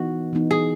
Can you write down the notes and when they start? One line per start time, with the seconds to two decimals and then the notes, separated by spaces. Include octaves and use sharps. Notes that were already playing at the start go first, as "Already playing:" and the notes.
Already playing: E3 B3 D#4 F#4
0.33 E3 B3 D#4
0.51 G#4